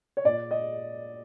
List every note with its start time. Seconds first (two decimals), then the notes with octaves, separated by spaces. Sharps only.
0.17 C#5
0.24 A#2 D5
0.51 D#5